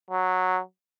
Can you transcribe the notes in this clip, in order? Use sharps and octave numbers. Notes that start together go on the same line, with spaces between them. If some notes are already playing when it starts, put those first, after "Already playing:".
F#3